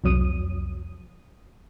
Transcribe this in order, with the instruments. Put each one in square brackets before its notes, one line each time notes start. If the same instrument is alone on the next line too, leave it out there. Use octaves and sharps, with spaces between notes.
[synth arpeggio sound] C2 F2 F#3 D#6 D#7